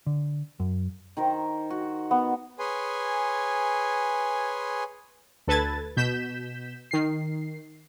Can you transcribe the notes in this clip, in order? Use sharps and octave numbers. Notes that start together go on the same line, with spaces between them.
D3
F#2
D#3 A#4 C5
F#4
B3
G#4 B4 C#5 G#5 C6
D2 A4 B4 A5 G#6 A6
B2 G6 B6 E7
D#3 C7